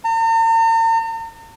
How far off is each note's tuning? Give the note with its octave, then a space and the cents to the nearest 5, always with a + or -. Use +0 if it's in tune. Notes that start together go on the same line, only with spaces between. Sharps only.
A#5 -45